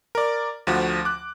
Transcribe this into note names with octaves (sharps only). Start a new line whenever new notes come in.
A#4 D5
D2 F3 F#4
D6 F#6